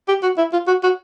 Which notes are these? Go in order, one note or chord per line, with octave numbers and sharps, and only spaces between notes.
G4
F#4
E4
F4
F#4
F#4